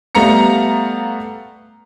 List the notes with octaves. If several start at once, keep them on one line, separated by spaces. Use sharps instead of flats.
G3 A3 B3 F5 A#5 C#7